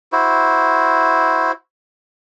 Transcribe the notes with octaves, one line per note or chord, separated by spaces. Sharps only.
E4 F#4 C5